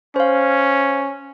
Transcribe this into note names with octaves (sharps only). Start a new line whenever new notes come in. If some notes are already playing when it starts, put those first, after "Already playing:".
C#4 C5 F5